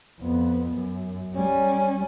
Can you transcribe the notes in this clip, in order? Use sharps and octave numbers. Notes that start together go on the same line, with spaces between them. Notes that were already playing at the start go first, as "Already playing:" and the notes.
F2 B3
F#2
G3 C#4